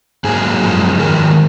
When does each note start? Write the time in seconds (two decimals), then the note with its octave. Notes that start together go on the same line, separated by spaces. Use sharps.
0.24 G#2 F#3 A#3 G#4
0.61 F#2 F3 G#3
0.99 G#2 D#3 F#3 A#4